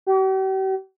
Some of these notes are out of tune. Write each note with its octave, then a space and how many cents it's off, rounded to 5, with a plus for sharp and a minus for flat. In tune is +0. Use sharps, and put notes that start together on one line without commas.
G4 -45